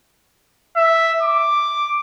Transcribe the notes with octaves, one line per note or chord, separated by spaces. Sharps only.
E5
D6